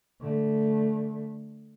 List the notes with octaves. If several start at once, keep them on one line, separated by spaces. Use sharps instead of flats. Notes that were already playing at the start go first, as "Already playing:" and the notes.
D3 A3